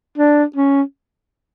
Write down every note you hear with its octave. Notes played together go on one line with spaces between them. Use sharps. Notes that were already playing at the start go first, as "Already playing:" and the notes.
D4
C#4